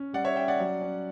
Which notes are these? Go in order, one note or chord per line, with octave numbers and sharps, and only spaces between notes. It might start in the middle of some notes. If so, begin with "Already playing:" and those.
Already playing: C#4
G3 D5 F#5
C#5 E5
C#4 E5 G5
D5 F#5
F#3
C#4